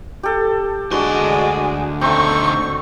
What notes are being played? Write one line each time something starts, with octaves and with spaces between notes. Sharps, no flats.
G4 A4
D2 G#3 D4 F#4 C6
B2 D#3 A3 C4 C#6